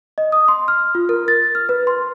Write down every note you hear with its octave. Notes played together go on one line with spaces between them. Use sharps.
D#5
D#6
C6
F6
F4
A#4
A6
F6
B4
C6